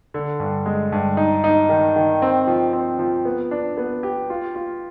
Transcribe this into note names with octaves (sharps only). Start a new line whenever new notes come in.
D3
G2
G#3
G2
D#4
D#4
D#3
D#3
C4
F3
C4
F3
B3
D4
B3
G4
F4
F4